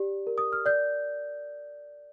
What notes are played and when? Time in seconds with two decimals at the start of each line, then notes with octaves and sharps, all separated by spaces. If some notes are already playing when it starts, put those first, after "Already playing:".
Already playing: G4 D5
0.27 A#4
0.38 D#6
0.52 F6
0.66 D5 G6